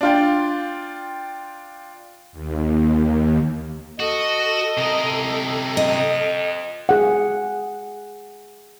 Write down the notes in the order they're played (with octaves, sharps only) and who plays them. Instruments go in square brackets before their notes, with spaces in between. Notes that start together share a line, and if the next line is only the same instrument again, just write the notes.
[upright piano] D4 F4 G5
[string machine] D#2
[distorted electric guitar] F#4 [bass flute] A4 [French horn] D#5
[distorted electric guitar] C3 A#4
[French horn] F2 [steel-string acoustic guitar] D#5
[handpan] G#4 F#5